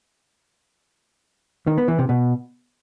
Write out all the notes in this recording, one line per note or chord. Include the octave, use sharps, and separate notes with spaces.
D#3
B3
E3
C3
B2